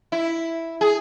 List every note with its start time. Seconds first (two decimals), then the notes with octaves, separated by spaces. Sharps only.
0.12 E4
0.81 G#4